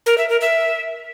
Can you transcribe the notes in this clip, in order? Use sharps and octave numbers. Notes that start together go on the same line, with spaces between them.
A#4
E5
A#4
E5